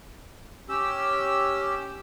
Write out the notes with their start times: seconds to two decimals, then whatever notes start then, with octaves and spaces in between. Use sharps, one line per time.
0.69 C#4 G4 E6